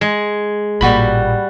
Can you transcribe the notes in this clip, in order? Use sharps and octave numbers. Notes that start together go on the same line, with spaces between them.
G#3
A1 A#2 G3 F#4 B5